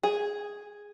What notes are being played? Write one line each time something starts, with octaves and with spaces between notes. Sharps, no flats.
G#4